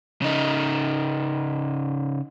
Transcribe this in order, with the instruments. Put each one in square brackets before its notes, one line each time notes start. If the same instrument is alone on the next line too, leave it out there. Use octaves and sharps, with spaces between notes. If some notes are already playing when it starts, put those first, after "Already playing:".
[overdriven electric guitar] C#3 D#4